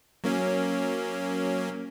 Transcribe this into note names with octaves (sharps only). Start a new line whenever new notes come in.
F#3 A#3 C#4